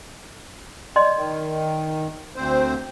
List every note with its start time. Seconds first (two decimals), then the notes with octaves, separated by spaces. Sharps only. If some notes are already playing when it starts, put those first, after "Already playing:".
0.96 D5 D#5 C6
1.17 D#3
2.36 D2 C4 C5